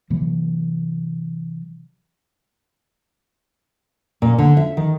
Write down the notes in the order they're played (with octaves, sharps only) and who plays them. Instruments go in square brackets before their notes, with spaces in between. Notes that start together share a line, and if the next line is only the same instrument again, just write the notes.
[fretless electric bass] C3 E3 F#3 A#3
[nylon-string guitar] A#2
D3
E5
D#3